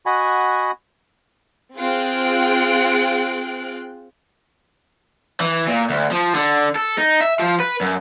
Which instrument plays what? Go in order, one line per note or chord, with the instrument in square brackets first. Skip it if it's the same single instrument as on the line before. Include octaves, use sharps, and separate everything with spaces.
[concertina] F#4 D#5 F#5 G#5 B5
[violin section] C4 F4 G#4 G5 F#6 D7
[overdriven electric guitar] E3
A#2
D2
F3
D3
A4
D#4
E5
F3
B4
F#2